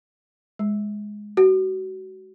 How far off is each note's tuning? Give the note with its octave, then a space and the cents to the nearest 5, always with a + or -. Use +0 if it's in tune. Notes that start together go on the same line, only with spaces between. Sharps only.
G#3 +0
F#4 +30